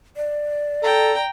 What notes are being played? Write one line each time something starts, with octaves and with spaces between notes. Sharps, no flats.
D5
A4 G5 A#5